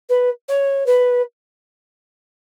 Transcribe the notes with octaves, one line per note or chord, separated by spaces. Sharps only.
B4
C#5
B4